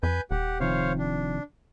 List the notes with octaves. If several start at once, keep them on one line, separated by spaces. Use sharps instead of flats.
F2 B4 G#5 G6
D#1 G4 F#5
C3 D#3 F3 C5 C#5 F5
D4